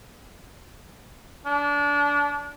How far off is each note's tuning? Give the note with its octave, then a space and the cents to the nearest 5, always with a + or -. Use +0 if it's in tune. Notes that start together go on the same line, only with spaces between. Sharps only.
D4 -25